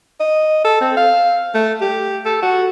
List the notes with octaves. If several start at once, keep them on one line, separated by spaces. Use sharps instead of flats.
D#5
A4
C4
F5
A3
G4
A4
F#4